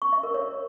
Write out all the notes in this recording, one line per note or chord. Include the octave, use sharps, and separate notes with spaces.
C#6
E5
A#4
C#5